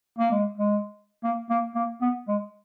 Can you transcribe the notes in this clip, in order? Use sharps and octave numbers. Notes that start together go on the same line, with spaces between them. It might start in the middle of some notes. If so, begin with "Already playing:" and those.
A#3
G#3
G#3
A#3
A#3
A#3
B3
G#3